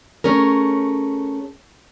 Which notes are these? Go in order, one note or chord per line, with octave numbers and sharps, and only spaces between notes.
A3 C#4 G#4 A#4